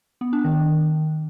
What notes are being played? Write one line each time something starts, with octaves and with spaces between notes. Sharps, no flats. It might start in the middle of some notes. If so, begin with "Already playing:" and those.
B3
D4
D#3